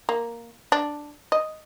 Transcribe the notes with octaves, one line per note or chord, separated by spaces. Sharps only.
A#3
D4
D#5